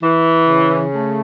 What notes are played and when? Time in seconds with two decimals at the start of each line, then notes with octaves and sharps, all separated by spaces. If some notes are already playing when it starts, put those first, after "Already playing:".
0.02 E3
0.47 C#3
0.93 A3